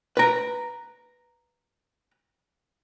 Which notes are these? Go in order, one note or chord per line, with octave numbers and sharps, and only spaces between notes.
B4 A#5